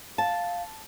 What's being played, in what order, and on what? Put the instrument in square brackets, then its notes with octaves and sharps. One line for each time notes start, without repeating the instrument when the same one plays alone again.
[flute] F5 [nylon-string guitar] A5